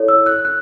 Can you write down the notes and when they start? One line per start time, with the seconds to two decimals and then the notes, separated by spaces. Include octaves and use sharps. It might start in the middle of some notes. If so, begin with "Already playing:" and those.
Already playing: E4 A4 C#5
0.08 E6
0.26 F#6
0.45 F#6